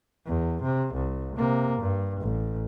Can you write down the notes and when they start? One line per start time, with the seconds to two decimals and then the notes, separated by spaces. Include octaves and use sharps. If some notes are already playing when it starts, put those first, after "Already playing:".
0.26 E2
0.63 C3
0.94 C2
1.36 C3 A#3
1.80 G2
2.21 A1